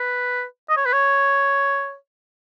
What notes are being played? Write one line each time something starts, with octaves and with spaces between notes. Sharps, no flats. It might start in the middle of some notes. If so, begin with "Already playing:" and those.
Already playing: B4
D#5
C#5
B4
C#5